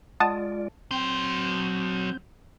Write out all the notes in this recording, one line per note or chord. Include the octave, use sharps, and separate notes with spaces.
G#3 F4 D5 F#5 A5 D#6
F#3 C4 C6 G6